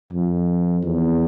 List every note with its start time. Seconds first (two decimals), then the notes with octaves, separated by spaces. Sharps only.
0.13 F2
0.84 E2